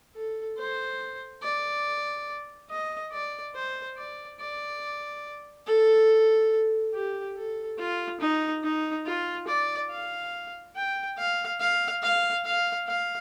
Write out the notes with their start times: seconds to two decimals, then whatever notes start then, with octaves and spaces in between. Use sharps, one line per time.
0.15 A4
0.58 C5
1.43 D5
2.70 D#5
3.12 D5
3.54 C5
3.97 D5
4.40 D5
5.67 A4
6.94 G4
7.36 A4
7.78 F4
8.20 D#4
8.63 D#4
9.06 F4
9.47 D5
9.90 F5
10.75 G5
11.18 F5
11.60 F5
12.03 F5
12.44 F5
12.87 F5